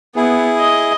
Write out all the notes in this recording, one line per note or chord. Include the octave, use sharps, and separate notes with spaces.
B3 E4 G#4
D#5